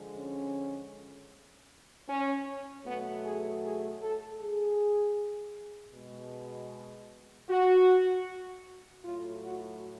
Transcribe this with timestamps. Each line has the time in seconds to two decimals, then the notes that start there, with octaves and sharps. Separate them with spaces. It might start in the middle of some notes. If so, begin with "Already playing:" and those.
Already playing: D3 F3 G#3
0.15 C#4
2.08 C#4
2.85 B2 F#3 A3 B3
3.24 G#4
3.63 G#4
4.01 A4
4.40 G#4
5.94 B2 G#3
7.49 F#4
9.04 A2 F#3 A3 F4
9.43 F#4